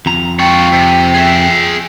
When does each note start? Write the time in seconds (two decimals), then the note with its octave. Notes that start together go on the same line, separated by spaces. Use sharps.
0.06 F2 A#5
0.39 F4 C#5 G5
0.72 C3
1.14 G#4 E5